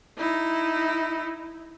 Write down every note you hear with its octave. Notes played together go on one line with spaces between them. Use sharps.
D#4 E4